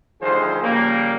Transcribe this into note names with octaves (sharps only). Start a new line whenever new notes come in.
D2 D#3 F3 G3 G#4 C5
C#3 F3 G3 A#3